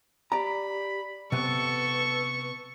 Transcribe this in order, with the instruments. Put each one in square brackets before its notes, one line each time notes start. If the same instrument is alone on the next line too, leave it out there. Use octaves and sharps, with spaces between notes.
[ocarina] G4 [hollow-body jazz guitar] D5 A#5 [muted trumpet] B5
[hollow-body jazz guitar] C3 B3 [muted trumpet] A4 [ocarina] B4 [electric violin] C#6